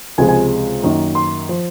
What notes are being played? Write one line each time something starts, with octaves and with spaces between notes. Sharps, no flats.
C#2 C3 F3 G#3 G#5
G#5
F#2 D#3 A#3
C6
F3